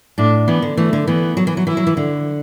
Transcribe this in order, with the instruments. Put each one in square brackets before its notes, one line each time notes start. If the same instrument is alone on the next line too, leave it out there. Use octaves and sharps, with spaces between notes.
[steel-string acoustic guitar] A2 [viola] D4
[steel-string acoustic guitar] E3 [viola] B3
[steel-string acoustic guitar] D3
[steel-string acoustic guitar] E3 [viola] A3
[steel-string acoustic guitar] D3
[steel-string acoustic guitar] E3 [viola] B3
[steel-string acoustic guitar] F#3
E3
F#3
[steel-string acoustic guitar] E3 [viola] E4
[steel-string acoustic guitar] F#3
E3
D3